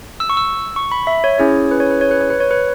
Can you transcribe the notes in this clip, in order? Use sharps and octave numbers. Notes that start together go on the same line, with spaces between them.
E6
C#6
E6
C#6
B5
E5
C#5
C#4 E4 G#4 C#5
B4
C#5
B4
C#5
B4
C#5
B4
C#5
B4